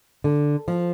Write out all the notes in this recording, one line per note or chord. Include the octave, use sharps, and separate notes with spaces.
D3
F3